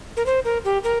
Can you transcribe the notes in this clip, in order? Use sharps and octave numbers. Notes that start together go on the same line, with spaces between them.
A#4
C5
A#4
G4
A#4